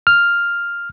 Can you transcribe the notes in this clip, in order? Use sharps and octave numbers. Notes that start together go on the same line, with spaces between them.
F6